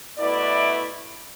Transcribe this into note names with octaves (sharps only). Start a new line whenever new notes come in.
B2 A3 E4 B4 D5